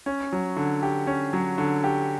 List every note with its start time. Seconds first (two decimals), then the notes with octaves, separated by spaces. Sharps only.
0.06 C#4
0.33 F#3
0.57 D3
0.83 G4
1.07 C#4
1.33 F#3
1.58 D3
1.84 G4